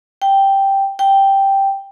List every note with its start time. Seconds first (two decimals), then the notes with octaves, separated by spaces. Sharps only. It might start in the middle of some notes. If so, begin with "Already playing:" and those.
0.22 G5
0.99 G5